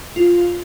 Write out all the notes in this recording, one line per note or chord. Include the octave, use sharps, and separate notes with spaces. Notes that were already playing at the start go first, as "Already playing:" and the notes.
F4